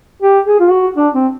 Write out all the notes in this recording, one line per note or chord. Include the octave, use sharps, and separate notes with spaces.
G4
G#4
F4
F#4
D4
C4